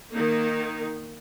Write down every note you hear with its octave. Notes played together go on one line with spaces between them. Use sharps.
D#3 A#3 D#4